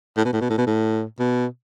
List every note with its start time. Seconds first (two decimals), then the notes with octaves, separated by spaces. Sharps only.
0.17 A2
0.25 B2
0.33 A2
0.41 B2
0.50 A2
0.58 B2
0.67 A2
1.19 B2